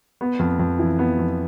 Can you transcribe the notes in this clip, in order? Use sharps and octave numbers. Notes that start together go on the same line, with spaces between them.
B3
F2
F2
E3
B3
F2